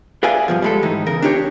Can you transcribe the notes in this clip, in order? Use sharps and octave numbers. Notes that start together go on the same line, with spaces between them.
G#4 B4 D5 E5 F5 G#5
G2 B2 F3
G3 G#3 A4
G#2 D#3 E3 D#4
E2 C#3 A#4
D4 D#4 G4 B4 C#5